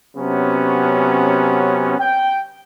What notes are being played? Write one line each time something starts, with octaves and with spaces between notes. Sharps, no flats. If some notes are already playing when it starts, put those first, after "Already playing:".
C3 F#3 B3 C#4
G5